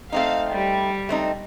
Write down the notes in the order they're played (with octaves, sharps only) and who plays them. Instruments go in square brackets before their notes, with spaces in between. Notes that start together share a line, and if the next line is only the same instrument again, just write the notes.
[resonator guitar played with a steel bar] A3 C4 D#4 [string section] F5
[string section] G3
[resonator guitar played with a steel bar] A3 C4 D#4